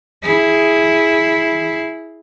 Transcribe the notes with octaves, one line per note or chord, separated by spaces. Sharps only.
E4 G#4